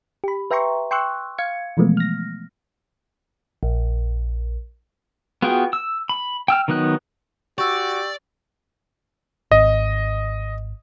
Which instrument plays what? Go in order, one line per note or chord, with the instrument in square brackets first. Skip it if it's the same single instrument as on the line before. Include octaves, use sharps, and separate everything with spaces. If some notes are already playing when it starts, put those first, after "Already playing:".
[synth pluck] G4 B5
B4 E5 G5 A#5 C6 C#6
G5 C6 C#6 E6 F#6
F5 G#6 C#7
B2 E3 F3 G#3 A3 B3
F6 A#6
[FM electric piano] A#1
[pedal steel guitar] B3 F4 F#4 G#4 G5
E6
B5
G5 E6 F6
D#3 F#3 B3 D#4 F#6
[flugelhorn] F#4 [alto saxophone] G4 [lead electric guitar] D5 [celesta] C#6 E6
[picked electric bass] G#1 [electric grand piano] D#5